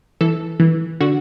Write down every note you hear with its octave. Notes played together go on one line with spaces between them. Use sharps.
E3 A4
E3
D3 F#4